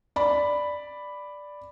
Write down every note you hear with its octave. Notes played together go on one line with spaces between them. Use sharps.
D5 B5